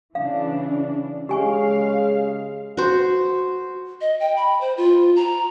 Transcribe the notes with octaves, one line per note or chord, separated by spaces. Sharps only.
C#3 E3 D4 F5
C#3 G#3 G4 F5 G#5 C#6
F#4 C5
D#5
G5
B5
C5
F4
A#5